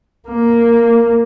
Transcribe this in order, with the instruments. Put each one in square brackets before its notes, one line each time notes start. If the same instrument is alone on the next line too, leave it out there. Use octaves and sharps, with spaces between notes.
[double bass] A#3